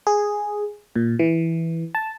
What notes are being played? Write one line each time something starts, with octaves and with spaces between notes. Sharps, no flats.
G#4
A#2
E3
A5